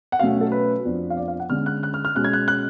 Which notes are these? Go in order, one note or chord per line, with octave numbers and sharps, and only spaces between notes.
F#5
B2 F#3 A3 C#4 F5
A4
B4
F2 F3 B3 D4
F5
D5
F5
F#5
D3 G#3 C#4 F6
F#6
F#6
F6
F6
B2 G#3 C#4 F#6
G#6
F#6
F#6